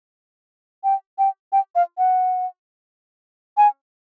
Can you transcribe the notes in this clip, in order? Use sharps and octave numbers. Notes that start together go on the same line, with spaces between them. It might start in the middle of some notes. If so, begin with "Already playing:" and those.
G5
G5
G5
F5
F#5
G#5